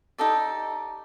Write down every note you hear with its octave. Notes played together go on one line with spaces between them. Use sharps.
D#4 G4 A4 D5